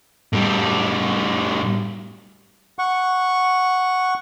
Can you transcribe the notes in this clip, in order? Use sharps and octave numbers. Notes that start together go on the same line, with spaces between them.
A2 G3
F#5 C#6